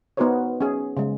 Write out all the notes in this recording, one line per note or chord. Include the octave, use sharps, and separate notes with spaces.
B3 D#4 F#4 A#4 C5 C#5
C#4 G#4
C#3 G#3